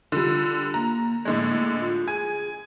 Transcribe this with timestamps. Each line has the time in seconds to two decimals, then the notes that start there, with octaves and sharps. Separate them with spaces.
0.12 D3 G3 F4
0.74 A#3 A#5
1.25 A2 D3 G#3 A#3
1.80 F4
2.08 G#4 G#5